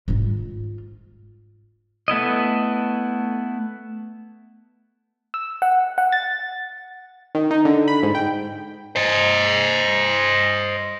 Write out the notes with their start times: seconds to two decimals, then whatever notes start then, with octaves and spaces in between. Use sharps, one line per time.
0.08 G#2 F4
2.08 A3 B3 E4 D#5
5.34 E6
5.62 F#5
5.98 F#5
6.12 A6
7.35 D#3
7.51 D#4
7.65 D3
7.88 B5
8.03 G#2
8.15 G5
8.96 C5 D#5